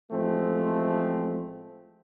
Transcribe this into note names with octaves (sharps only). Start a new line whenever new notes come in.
A1 F3 G#3 A3 C4